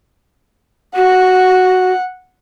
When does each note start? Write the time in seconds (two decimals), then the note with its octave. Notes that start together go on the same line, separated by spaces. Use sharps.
0.96 F#4 F#5